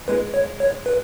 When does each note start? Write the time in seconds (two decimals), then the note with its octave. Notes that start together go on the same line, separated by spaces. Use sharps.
0.08 G#3 B4
0.34 C#5
0.60 C#5
0.86 B4